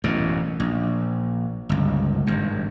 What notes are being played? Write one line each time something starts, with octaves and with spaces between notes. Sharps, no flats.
A1 F#2 B2
A#1
G1 C#2
G#1 G2